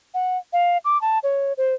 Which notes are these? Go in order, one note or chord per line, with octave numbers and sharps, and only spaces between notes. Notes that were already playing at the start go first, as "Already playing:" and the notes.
F#5
F5
D6
A5
C#5
C5